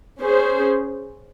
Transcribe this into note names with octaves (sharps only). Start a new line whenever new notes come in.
C#4 G#4 C5